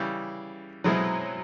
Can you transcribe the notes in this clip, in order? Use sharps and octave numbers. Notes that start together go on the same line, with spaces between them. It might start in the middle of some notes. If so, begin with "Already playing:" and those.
Already playing: C#3 E3 G3
B2 F#3 G#3 C4 E4